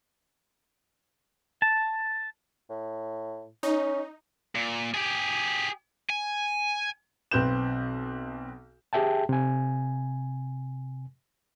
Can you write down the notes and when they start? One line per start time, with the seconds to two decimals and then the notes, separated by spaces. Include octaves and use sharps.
1.62 A5
2.70 A2
3.63 C#4 D#4
4.56 A#2
4.94 G4 G#4
6.10 G#5
7.31 B1 C4 B4 G6 E7
8.93 G4 G#4 E5 G5 A5
9.29 C3 G#5